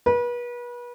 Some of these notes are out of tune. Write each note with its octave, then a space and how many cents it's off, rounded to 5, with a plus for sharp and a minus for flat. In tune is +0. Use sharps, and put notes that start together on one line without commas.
B4 -35